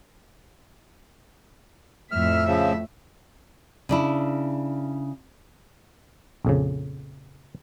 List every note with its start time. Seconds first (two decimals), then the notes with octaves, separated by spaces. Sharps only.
2.11 F2 A2 E5 F6
2.47 C#3 F3
3.89 C#3 D4 E4
6.45 A#1 F2 C#3